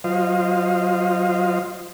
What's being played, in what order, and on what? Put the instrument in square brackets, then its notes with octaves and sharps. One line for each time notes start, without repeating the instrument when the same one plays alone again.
[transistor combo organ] F#3 F4 C5 D#5 F5